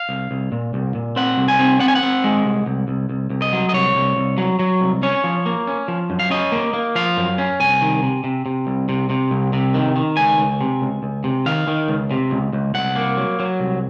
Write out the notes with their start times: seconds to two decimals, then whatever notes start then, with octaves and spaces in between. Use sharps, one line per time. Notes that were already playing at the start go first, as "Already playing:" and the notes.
Already playing: F5
0.09 C2
0.31 C2
0.52 A#2
0.74 C2
0.95 A#2
1.16 C4 F#5
1.38 C2
1.48 G#5
1.59 C4
1.80 C4 F#5
1.88 G#5
1.95 F#5
2.03 C4
2.24 G#3
2.45 C2
2.66 C2
2.88 C2
3.09 C2
3.30 C2
3.42 D#5
3.53 F#3
3.69 D#5
3.74 C2 C#5
3.95 C2
4.17 C2
4.38 F#3
4.59 F#3
4.81 C2
5.03 C#4 C#5
5.24 F3
5.46 A#3
5.67 C#4
5.88 F3
6.10 F#2
6.19 F5
6.30 C#4 D#5
6.52 A#3
6.73 A#3
6.95 F3 F5
7.17 F#2
7.38 C#4
7.60 C2 G#5
7.81 D#3
8.03 C3
8.24 C3
8.46 C3
8.67 C2
8.89 C3
9.10 C3
9.31 C2
9.53 C3
9.74 D#3
9.96 D#3
10.17 C#2 G#5
10.38 C#2
10.61 C3
10.82 C#2
11.03 C#2
11.24 C3
11.46 D#3 F5
11.67 D#3
11.88 C#2
12.11 C3
12.31 C#2
12.53 C#2
12.74 C2 F#5
12.96 A#3
13.17 F#3
13.40 F#3
13.60 C2